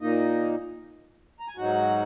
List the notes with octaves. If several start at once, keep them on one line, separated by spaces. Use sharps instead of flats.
A#2 A#3 D#4 D#5
A#5
G#5
G#2 F#3 D#4 F#4 F#5